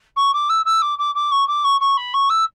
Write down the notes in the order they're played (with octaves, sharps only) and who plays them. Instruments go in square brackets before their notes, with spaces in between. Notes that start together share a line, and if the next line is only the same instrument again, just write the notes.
[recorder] C#6
D6
E6
E6
D6
D6
D6
C#6
D6
C#6
C#6
B5
C#6
E6